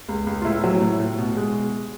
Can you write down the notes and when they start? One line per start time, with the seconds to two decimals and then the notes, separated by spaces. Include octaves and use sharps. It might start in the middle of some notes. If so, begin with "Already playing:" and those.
0.09 C#2
0.27 C#2
0.41 F4
0.45 A2 E4
0.64 F#3
0.81 A2
1.00 A2
1.18 B2
1.37 G#3